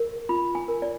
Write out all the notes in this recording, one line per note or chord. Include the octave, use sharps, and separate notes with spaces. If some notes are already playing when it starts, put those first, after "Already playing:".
Already playing: A#4
F4 B5
G#5
A#4
D5